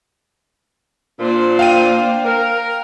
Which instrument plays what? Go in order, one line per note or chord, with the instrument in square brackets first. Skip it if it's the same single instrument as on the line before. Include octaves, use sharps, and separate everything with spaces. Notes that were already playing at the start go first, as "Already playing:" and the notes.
[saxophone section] A#2 C4 F4 [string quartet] A#3 D4 C5
[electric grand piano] F5 G5 D#7
[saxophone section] A#4